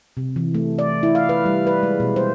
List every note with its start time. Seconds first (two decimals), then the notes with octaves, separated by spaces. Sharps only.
0.17 C3
0.36 E3
0.54 A3
0.79 D5
1.03 E4
1.15 F5
1.29 B4
1.46 G3
1.67 B4
1.83 G#3
2.00 B2
2.16 C5